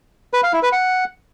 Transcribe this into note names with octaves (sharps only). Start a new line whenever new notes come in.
B4
F5
E4
B4
F#5